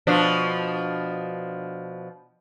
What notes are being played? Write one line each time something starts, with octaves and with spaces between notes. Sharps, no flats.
B2 F3 D4